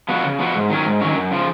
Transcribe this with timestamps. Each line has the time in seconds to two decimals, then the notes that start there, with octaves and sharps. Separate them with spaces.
0.09 F3 B3 F#4
0.24 C#3
0.39 F3 B3 F#4
0.55 G#2
0.70 D#3 F#3 C#4
0.86 G#2
1.01 D#3 F#3 C#4
1.16 F#2
1.31 C#3 F3